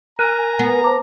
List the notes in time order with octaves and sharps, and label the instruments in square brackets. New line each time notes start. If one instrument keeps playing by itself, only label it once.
[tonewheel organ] A#4 G#5 [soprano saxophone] A#5 [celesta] F#6
[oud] B3
[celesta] C5 A5 D6